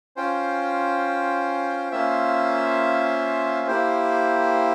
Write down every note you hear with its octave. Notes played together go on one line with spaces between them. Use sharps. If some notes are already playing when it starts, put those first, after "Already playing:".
C#4 F4 C5 G5
A#3 C#4 F4 C5 E5
A#3 E4 G4 C5